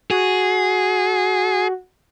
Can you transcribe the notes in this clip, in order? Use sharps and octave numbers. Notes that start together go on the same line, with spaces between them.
F#4 G#4